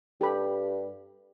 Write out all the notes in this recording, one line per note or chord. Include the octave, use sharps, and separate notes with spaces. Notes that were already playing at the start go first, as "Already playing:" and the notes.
G2 G4 A4 B5